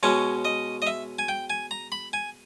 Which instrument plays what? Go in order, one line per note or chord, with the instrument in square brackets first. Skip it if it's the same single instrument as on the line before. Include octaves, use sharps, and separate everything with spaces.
[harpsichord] B2 G#3 C#4 C#5
D#5
D#5
E5
G#5
G5
G#5
A#5
B5
G#5